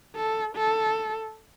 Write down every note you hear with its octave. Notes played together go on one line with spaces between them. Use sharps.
A4
A4